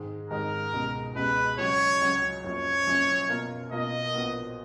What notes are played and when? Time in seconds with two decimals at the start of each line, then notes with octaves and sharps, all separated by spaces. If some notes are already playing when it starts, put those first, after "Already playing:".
Already playing: G#2 D#3 G#3 D#4
0.30 G#2 D#3 G#3 D#4 A#4
0.73 C#2 B2 G#3
1.16 C#2 B2 G#3 B4
1.58 C#2 C#3 F#3 C#4 C#5
2.01 C#2 C#3 F#3 C#4
2.43 F#1 F#2 F3 A#3 C#5
2.86 F#1 F#2 F3 A#3
3.29 B2 A#3 F4 A#4
3.72 B2 A#3 F4 A#4 D#5
4.14 A#1 A#2 F3 B3 F#4